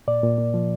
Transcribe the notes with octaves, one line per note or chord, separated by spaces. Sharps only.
A#2 D5
A#2
A#3
F3